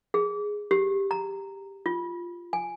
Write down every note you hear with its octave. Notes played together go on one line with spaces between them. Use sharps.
G#4
G4
A#5
F4
G#5